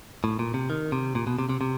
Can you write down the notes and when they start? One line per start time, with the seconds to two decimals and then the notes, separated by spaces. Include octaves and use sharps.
0.24 A2
0.39 A#2
0.54 C3
0.70 D#3
0.92 C3
1.15 A#2
1.27 B2
1.39 C3
1.49 C3
1.61 C3